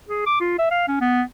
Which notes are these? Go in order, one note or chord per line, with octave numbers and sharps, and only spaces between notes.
G#4
D6
F4
E5
F5
C#4
B3